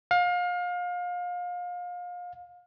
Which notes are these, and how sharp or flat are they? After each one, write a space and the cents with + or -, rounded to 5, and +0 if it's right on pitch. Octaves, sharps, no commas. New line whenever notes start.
F5 +30